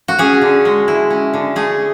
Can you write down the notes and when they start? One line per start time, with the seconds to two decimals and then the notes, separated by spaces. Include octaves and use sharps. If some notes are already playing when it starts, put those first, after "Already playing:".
0.08 F#4
0.19 C#4 G#4
0.42 D3
0.65 G#3
0.88 E4
1.10 C#4
1.34 D3
1.56 A3 G#4